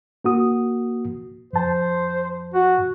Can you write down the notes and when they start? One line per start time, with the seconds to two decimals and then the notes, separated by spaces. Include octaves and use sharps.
0.24 A#3 F#4 D#6
1.53 F2 C5 A5
2.54 F#4